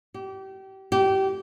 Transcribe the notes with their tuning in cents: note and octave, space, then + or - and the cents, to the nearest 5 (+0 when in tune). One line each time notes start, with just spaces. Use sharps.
G4 -30
G4 -25